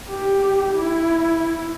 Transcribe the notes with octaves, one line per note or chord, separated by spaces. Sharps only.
G4
E4